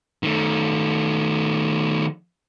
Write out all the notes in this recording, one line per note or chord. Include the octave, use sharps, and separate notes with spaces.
D#3 A3